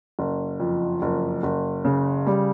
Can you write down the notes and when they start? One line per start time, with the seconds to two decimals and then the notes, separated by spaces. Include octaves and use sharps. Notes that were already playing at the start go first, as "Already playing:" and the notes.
0.19 F#1
0.60 F2
1.02 F#1
1.43 F#1
1.85 C#3
2.27 G3